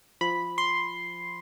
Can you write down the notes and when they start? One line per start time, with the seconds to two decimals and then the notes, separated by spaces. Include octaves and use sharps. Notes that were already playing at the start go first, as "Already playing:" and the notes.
0.21 F3 B5
0.58 C6